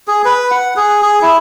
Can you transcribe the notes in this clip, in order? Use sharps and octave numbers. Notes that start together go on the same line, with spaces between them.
G#4
B4
F#5
G#4
G#4
E4